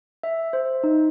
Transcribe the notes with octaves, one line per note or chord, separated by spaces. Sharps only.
E5
C5
D#4